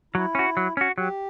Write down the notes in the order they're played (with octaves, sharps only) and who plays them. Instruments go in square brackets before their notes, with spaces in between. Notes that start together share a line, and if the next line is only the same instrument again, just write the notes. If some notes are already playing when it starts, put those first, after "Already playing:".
[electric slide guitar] F#3 [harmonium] E4
[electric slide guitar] C#4 F#4
F#3
C#4 F#4
[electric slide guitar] F#3 [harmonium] G4